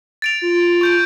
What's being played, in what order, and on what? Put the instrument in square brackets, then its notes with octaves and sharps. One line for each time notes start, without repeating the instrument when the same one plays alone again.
[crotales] A6 D7 F7
[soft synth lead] F4
[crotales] C#6 G6 D7